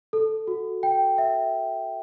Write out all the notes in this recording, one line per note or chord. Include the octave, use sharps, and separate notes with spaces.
A4
F#4
G5
E5